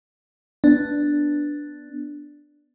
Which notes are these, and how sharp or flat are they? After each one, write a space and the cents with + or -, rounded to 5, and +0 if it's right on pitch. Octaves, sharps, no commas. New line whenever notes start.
B3 +0 D4 +0